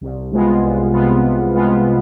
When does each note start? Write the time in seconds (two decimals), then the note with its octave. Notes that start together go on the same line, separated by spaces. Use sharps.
0.01 C2
0.31 C3 G#3 B3 F4
0.63 C2
0.93 C3 G#3 B3 F4
1.24 C2
1.54 C3 G#3 B3 F4